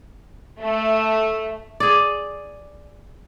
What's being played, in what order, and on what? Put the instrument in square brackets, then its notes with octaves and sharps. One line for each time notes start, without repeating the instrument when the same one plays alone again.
[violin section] A3
[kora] G#4 D5